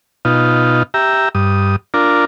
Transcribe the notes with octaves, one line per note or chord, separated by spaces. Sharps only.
B2 D#4 F4
G4 E5 A#5
G2 D#6
D4 F4 A#4